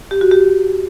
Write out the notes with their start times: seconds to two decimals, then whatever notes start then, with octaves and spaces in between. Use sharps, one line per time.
0.11 G4
0.21 F#4
0.31 G4